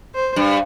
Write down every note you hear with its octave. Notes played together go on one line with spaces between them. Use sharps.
C5
G2